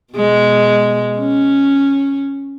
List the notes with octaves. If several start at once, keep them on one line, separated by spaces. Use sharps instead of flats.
B2 G#3
C#4